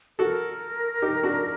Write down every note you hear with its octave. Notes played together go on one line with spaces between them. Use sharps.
F#4 A4 A#4
D#4 G4
D4 F#4